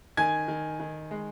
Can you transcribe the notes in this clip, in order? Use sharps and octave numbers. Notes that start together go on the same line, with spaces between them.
D#3 G#5 G#6
D#3
D#3
G#3